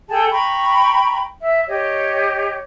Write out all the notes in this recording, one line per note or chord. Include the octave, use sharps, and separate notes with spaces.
G#4 A4 G5 A5
G5 A#5 B5 C#6
E5
G4 C#5 D#5